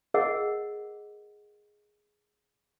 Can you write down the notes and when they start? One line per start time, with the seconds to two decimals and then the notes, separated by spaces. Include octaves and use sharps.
0.14 G#4 A#4 D#5 F#5